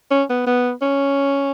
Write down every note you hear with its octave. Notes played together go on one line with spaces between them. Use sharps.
C#4
B3
B3
C#4